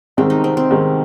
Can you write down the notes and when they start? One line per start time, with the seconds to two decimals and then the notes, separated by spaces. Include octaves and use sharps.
0.17 C2 C3 D#3 G#3 C4
0.30 D#4
0.44 C4
0.57 C4
0.71 C2 C3 D#3 G#3